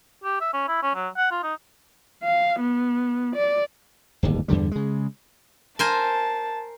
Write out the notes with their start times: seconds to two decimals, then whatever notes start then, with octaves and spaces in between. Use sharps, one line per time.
0.24 G4
0.41 E5
0.53 C#4
0.68 E4
0.83 C#4
0.95 F#3
1.17 F#5
1.31 F4
1.43 D#4
2.24 F5
2.60 B3
3.35 D5
4.23 D1 G1 D#2
4.48 E2 G2 D3 G3
4.71 C#3 G#3
5.79 A#4 C5 G#5 A5